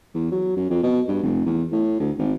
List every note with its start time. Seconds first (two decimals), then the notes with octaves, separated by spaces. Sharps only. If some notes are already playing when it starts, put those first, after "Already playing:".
0.14 E2
0.32 F#3
0.57 F#2
0.70 F2
0.83 B2
1.08 G2
1.23 F1
1.46 E2
1.72 A2
2.00 D2
2.19 G#1